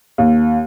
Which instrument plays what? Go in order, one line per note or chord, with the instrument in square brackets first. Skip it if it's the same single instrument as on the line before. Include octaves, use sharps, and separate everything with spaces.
[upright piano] D#2